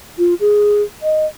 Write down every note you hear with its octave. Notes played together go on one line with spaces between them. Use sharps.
F4
G#4
D#5